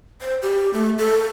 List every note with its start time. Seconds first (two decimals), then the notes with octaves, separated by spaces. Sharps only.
0.21 C5
0.42 G4
0.74 A3
0.98 A4